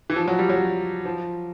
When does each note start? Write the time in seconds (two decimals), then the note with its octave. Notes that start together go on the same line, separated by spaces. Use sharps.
0.10 E3
0.16 F3
0.28 F#3
0.39 G3
0.50 F#3
1.05 F3